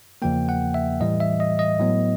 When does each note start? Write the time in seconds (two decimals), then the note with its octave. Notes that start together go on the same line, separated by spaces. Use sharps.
0.22 E2 C#3 F3 A#3 G5
0.49 F#5
0.74 E5
1.00 A2 E3 G3 D#5
1.20 E5
1.40 D#5
1.59 D#5
1.79 A2 F#3 B3